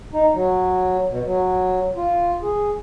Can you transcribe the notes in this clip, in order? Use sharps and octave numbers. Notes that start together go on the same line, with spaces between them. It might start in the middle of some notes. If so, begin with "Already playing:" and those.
D#4
F#3
B2
F#3
F4
G#4